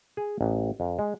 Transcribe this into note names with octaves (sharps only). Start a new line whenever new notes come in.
G#4
A1
F2
G#3